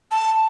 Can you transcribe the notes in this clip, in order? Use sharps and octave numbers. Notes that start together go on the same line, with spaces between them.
A5